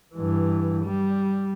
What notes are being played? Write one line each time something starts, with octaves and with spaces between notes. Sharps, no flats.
G2 E3
G3